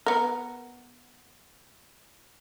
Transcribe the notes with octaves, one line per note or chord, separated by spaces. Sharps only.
B3 A#4